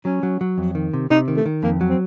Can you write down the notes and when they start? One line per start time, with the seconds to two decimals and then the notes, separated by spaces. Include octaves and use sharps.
0.05 F#3 C#4
0.23 F#3
0.41 F#3
0.58 F2
0.75 D#3
0.94 C3
1.10 C3 D#4
1.28 D#3
1.36 A3
1.45 D#3
1.63 F2 A#3
1.81 F#3
1.90 C4